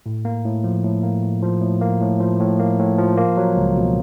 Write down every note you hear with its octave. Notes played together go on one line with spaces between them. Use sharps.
A2
A#3
A2
F3
A2
A#3
A2
F3
A2
A#3
A2
F3
A2
A#3
A2
F3
A#3
F#3
C#2
B2